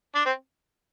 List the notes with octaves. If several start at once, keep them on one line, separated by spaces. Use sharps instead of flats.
D4
C4